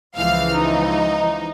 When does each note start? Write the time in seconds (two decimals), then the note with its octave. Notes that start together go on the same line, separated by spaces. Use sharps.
0.16 C#2 E3 F3 F5 F6
0.55 D#4